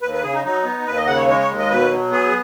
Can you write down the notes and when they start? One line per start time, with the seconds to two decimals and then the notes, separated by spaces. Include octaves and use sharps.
0.02 D#2 B4
0.12 B4
0.23 C#3 G#4
0.33 D#4
0.44 F#3 D#4
0.64 B3
0.86 D#2 B4
0.97 D#5
1.07 C#3 F#5
1.17 C#5
1.27 G#3 C#5
1.39 C#5
1.48 D#2
1.59 D#5
1.70 B2 B4
1.90 F#3
2.11 B3 G#4